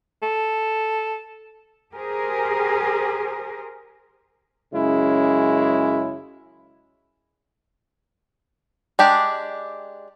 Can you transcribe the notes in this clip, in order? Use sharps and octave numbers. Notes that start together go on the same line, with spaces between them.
A4
G4 G#4 A#4 C5
F#2 C#3 G#3 C#4 E4
G#3 D4 G4